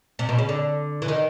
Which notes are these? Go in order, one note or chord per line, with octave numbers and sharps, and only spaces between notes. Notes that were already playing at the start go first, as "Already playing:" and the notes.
C3
B2
C#3
D3
E3
D#3